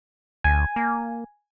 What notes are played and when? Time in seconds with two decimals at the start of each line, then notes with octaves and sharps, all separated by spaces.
0.44 D2 G#5
0.76 A#3